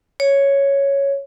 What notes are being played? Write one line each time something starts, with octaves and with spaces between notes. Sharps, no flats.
C#5